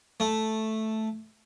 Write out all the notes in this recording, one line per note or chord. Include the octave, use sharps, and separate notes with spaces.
A3